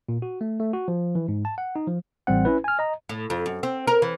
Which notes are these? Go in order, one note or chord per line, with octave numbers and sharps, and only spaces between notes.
A#2
F#4
A3
A3
F#4
F3
E3
G#2
A5
F#5
D#4
F3
A1 G3 C4 F#5
C#4 E4 B4
G#5 F6
D#5 A#5
A2
F2
F#2
C4
A#4
E3